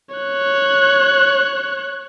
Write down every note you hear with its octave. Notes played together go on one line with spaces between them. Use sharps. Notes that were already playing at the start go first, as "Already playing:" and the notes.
C#5 F#6